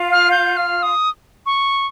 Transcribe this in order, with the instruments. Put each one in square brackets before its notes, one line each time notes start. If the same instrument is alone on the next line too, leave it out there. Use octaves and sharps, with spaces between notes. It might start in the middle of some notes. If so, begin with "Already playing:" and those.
Already playing: [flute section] F4 F5
[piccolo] F6
G6
F6
D#6
C#6